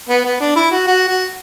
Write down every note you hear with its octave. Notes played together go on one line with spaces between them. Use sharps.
B3
B3
D4
E4
F#4
F#4
F#4